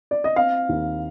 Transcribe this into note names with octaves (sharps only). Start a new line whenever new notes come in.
D5
D#5
C4 F5
D#2